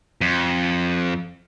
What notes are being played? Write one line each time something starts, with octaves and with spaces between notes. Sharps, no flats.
F2